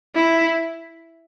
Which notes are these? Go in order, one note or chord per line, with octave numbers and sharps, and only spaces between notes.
E4